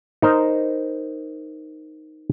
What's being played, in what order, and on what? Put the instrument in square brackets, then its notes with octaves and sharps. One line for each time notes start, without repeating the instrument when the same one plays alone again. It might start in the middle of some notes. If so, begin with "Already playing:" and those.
[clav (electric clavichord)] D#4 A#4 C5